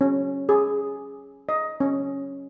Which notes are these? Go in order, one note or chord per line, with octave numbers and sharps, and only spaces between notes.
C#4
G#4
D#5
C#4